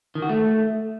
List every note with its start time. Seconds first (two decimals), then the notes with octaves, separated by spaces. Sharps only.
0.15 D#3
0.22 F#4
0.29 A3